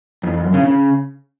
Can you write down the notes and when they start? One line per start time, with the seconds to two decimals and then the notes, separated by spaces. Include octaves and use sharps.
0.23 F2
0.34 F2
0.44 F#2
0.54 C#3
0.64 C#3